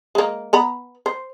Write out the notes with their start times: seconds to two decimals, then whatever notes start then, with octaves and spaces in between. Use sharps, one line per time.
0.15 G#3 A#3
0.53 B3 A#5 B5
1.06 C5